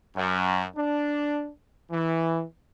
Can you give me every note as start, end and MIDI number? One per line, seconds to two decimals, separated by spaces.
0.15 0.65 42
0.76 1.48 62
1.90 2.43 52